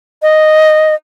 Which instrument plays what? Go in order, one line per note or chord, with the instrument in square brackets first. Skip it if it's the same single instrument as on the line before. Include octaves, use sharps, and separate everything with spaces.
[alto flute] D#5